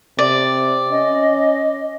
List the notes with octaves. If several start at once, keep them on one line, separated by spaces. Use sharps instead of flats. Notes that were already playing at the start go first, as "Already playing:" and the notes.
C3 D5
C#4 D#5